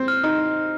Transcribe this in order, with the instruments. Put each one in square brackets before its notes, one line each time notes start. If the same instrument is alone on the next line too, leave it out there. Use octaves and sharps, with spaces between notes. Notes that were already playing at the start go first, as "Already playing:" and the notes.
Already playing: [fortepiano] C4
[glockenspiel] F6
[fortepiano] D#4 [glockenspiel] F6